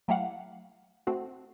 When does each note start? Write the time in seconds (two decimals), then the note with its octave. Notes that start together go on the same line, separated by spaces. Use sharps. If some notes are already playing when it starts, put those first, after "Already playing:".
0.08 F#3 A3 E4 G4 F5 F#5
1.07 A3 C4 F#4